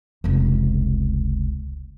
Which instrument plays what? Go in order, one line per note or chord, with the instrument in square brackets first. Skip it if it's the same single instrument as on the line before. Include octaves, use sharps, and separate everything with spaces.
[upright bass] F1 C#2